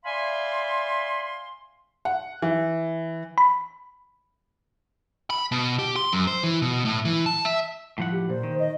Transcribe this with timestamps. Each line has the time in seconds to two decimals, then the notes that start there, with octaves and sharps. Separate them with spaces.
0.04 D5 E5 F5 G#5 B5 C6
2.05 F#5
2.42 E3
3.38 B5
5.30 B5
5.52 B2
5.79 G4
5.96 C6
6.13 F#2
6.27 C5
6.44 E3
6.62 B2
6.85 A2
7.05 E3
7.26 A5
7.45 E5
7.98 A2 F3 F#5
8.12 G4
8.30 A#2 C5
8.43 D#3
8.59 D#5